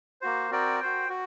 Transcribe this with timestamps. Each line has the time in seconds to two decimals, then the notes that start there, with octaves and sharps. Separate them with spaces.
0.21 A#3 F#4 C5
0.51 C4 F#4 A#4 D5 G5
0.80 F#4 C5 G5
1.09 F#4